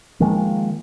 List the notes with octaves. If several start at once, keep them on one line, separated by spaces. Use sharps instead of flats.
D#3 F3 G#3 A#3